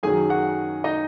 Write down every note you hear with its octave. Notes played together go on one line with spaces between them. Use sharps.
F#2 D#3 F#3 G#4 G#5
F#4 F#5
D#4 D#5